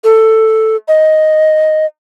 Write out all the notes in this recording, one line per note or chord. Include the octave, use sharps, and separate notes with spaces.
A4
D#5